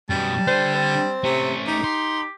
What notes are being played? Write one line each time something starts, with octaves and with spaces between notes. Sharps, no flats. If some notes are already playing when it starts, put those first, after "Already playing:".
F#2 B2 G3 A5
D3 C5
C4
C3 A3 C#4
D#4 G4
G4 C6